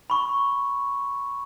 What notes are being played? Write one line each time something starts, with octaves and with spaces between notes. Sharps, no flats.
B5 C#6